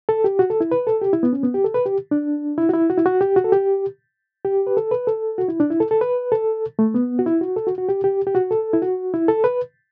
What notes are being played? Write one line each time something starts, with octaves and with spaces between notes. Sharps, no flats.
A4
G4
F#4
A4
E4
B4
A4
G4
E4
B3
C#4
B3
G4
A4
B4
G4
D4
E4
F#4
E4
F#4
E4
F#4
G4
F#4
A4
G4
G4
B4
A4
B4
A4
F#4
E4
D4
E4
A4
A4
B4
A4
A3
B3
F#4
E4
F#4
A4
F#4
F#4
G4
G4
G4
F#4
A4
E4
F#4
E4
A4
B4